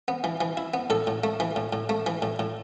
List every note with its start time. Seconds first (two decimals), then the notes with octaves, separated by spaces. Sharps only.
0.08 B3
0.24 E3
0.41 E3
0.57 E4
0.74 B3
0.90 A2 A4
1.07 A2
1.24 A3
1.40 E3
1.56 A2
1.73 A2
1.89 A3
2.06 E3
2.22 A2
2.39 A2